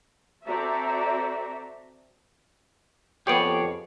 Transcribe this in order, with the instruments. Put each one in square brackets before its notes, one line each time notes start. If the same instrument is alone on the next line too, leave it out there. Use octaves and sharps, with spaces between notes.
[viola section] C4 F#4 A4 D5 E5 A#5
[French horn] F2 [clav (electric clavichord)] B3 G4 [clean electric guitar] G#4 C#5 D5